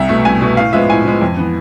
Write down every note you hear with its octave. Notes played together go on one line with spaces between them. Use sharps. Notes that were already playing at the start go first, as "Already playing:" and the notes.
Already playing: C2 E5
B2 A3
C2 G#5
B2 A3
A2 F5
F3 G#3 B3 E5
A2 G#5
F3 G#3 B3
F2
E3 B3